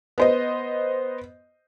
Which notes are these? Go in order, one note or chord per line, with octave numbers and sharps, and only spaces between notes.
B3 C5 D#5